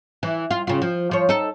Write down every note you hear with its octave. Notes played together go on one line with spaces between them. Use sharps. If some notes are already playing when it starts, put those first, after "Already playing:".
E3
F4
C#3 F4
F3
F3 C#5
D#4 A4